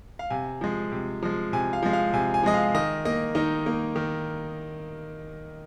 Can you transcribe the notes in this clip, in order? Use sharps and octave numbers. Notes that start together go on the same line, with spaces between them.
F5
C3 G#5
F3 G#3
C3
F3 G#3
C3 G#5
F5
F3 G#3
F5
C3 G#5
G#5
F3 G#3 D#5
F5
D#3 D#5
A#3 D#5
D#3 D#4
A#3
D#3